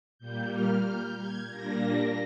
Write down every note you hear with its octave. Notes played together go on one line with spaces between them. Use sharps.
A#2 G3 A#3 G6
F6
G6
G#6
A#2 G3 A#3 D4 A#6